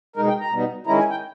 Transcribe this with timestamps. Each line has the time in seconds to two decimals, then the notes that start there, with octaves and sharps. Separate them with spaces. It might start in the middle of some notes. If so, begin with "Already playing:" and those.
0.16 B2 G#3 D#4 A#4
0.28 G5
0.40 A#5
0.52 B2 G3 B3 D#4
0.86 D#3 G#3 C#4 E4 A#5
0.99 G#5
1.11 G5